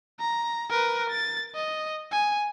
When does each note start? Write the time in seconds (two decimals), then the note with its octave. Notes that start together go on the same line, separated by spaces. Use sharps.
0.20 A#5
0.70 A#4 B4
1.09 A6
1.55 D#5
2.11 G#5